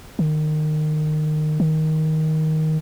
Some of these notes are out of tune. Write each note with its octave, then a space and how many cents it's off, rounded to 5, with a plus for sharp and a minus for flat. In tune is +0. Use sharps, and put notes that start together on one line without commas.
D#3 -25
D#3 +10